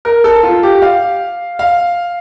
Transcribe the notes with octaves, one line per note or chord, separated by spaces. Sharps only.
A#4
A4
F4
G4
F5
F5